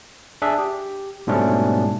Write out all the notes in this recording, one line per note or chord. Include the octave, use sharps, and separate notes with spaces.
D4 G#4 E5
G4
G#2 B2 G3 A3 C#4 D4